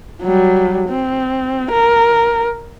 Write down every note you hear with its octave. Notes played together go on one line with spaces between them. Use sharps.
F#3 G3
C4
A#4